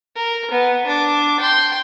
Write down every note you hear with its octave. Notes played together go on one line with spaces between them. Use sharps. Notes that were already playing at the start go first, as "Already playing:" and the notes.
A#4
B3
D4 D6
G5 C6